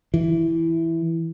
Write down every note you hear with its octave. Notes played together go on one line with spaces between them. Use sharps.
E3